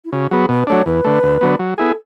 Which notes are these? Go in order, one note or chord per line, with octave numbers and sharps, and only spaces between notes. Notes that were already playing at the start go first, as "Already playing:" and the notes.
E4
C#3 F#4
F#3 B3 G#4
B2 B4
F#3 A3 D4 C#5
E2 B4
D3 A3
D2
D3 F#3 B3
F#3
B3 E4 G#4 A4